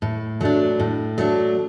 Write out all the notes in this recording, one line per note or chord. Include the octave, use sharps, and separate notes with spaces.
A2
F#3 A3 D4
A2
F#3 A3 D4